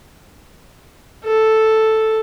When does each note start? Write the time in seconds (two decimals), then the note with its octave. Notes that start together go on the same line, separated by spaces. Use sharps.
1.24 A4